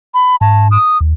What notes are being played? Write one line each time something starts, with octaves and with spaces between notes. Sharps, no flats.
B5
G#2 A5
D#6
D#2